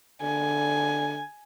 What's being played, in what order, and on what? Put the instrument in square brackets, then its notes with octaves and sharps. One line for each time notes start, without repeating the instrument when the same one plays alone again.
[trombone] D3 [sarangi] G#5